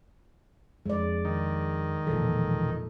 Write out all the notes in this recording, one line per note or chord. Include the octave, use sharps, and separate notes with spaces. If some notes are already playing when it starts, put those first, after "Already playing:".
F2 G#3 D5
D#3
E1 A#2 F3 A4